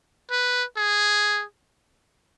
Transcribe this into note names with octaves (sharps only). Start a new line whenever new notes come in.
B4
G#4